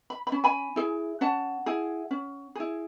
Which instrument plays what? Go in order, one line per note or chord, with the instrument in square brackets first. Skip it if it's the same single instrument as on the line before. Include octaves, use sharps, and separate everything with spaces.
[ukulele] B5
B5
C#4
G#5 B5
E4 G#4
C#4 F#5 A5
E4 G#4
C#4
E4 G#4